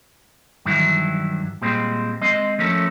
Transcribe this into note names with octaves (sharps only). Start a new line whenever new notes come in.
G2 D#3 E3 F#3 E4
A#2 G3 G#3 C4
G#3 C4 D#5
F3 A3 C#4 A4 A#4